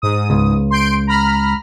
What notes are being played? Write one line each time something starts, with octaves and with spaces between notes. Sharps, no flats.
G#2 D#6
C#2
C6 G6 D7
A#5 B5 F6